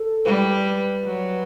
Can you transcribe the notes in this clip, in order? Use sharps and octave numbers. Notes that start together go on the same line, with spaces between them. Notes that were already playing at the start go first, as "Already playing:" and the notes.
Already playing: A4
G3 B4
F#3